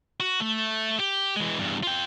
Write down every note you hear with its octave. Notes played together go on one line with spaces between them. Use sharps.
F#4
A3
G4
E3 G#3
E2 G2
F4 G5